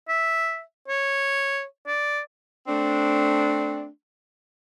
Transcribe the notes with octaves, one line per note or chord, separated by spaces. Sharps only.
E5
C#5
D5
A3 C4 D4